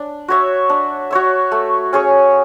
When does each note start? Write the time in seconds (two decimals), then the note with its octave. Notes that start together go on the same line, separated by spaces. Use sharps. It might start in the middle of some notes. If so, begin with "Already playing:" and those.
Already playing: D4
0.28 F#4 C#5 E5
0.69 D4
1.11 F#4 C#5 E5
1.52 A3
1.93 C#4 G#4 C#5